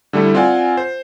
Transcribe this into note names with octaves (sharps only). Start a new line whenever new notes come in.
D3 G3 A3 E4
C4 F4 D5 F#5 G#5
C5